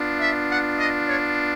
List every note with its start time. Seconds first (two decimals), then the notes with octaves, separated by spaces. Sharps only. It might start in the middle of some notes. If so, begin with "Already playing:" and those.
Already playing: B3 D4 F4
0.20 E5
0.48 F#5
0.77 D#5
1.07 C#5